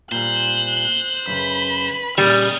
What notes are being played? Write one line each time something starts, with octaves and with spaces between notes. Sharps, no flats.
A#2 G3 C5 F#6
F#2 A#2 C#3 B4 B5
A#2 C#3 G3 D#4 C#5 D#6 F6